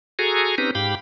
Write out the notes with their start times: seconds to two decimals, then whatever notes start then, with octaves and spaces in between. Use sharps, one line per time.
0.19 F#4 G#4 A4 G#5 A#5
0.58 C4 C#4 D#4 G4 B4 A#5
0.75 G#2 G4 F5 G5 B5